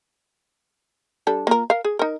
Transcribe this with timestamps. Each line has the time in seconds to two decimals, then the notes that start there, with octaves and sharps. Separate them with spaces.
1.27 G3 D4 A4
1.47 A#3 F4 A#4
1.70 A#4 F5
1.84 G#4
1.99 D#4 A#4